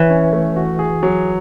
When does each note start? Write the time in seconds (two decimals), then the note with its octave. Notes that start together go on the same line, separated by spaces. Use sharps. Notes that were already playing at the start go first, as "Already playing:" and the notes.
Already playing: E3 C#5
0.10 C#4
0.33 A3
0.56 F#4
0.79 G#4
1.03 F#3